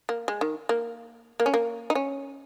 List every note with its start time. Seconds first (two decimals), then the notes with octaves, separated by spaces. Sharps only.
0.09 A#3
0.28 G#3
0.41 D#3
0.69 A#3
1.40 A#3
1.46 C#4
1.54 A#3
1.90 D#4
1.95 C#4